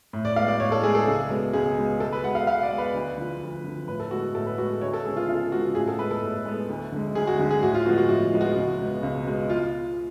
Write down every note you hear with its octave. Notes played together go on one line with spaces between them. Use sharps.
A2
D5
G#3 B3 F5
D5
A2 C#5
A4
G#3 B3 G#4
A4
C#2
B2 G#3 B3
C#2 G#4
B2 G#3 B3
B2 A4
B4
G#3 B3 F#5
F5
B2 F5
D5
G#3 B3
B4
D2
D3 F3
D2
D3 F3
A2 B4
A4
G#3 B3 F#4
A2 A4
B4
G#3 B3 F#4
D2 C#5
A4
C#3 G#3 B3 G#4
F4
D2 F4
C#3 G#3 B3 F#4
A2 G#4
A4
G#3 B3 B4
A4
A2
G#3 B3
D2
D3 G#3
D2 G#4
F#4
D3 G#3 F#4
G#4
A2 F#4
F4
F3 G#3 B3 F#4
F#4
A2 F#4
F3 G#3 B3
F#4
C#2
B2 G#3 B3
C#2
B2 G#3 B3
F4